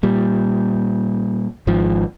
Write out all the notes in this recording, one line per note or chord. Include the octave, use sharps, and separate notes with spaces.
A#2 G3
G#1 G#2 F3